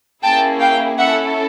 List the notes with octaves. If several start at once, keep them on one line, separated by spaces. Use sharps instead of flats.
A#3 C#4 E4 G#4 G5 A5
F5 G5
C#4 E4 A4 E5 F#5